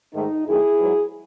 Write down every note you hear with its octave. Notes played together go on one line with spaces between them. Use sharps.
G#2 D#3 A3 D#4
F#2 D#3 A3 E4 G#4
G#2 F#3 B3